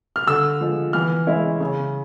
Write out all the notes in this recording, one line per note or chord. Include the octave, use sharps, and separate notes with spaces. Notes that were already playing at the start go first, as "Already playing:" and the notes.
F6
D3 E6
F3 G#3
E3 F6
G#3 C#4 E4
C#3